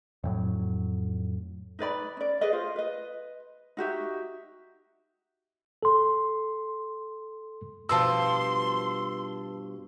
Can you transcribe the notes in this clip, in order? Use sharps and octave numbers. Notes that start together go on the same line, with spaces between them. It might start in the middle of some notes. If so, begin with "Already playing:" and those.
F2 A2 F#3
D#4 B4 D5 B5
C#4 D5
G#4 B4 D5 D#5
F4 C5 F5
B4 D#5
D#4 F#4 G4 E5
A4 C6
G2 B2 F3 A5 C6 E6